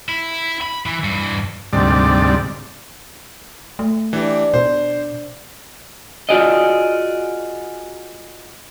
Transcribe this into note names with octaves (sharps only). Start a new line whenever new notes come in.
E4
B5
E3
G2 E3
D2 G#2 C3 G3 D5
A3
E3 D4 G4
B2 C5
F4 F#4 G#4 D5 D#5